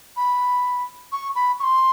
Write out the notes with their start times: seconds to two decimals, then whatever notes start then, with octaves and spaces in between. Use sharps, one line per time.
0.17 B5
1.12 C#6
1.35 B5
1.60 C#6
1.63 C6